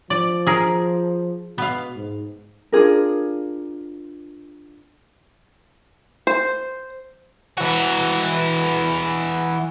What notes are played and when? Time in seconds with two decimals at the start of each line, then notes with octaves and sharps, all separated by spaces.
0.10 F3 D5
0.47 G#4 A#4
1.58 B2 B3 F5
1.96 G#2
2.72 D4 F4 G#4 A#4
6.27 C5
7.58 E3 F#4